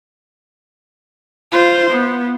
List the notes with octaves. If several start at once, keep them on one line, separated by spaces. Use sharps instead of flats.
F4 C5
B3